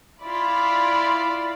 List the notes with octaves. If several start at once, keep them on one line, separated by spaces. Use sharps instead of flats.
E4 F4 D5 B5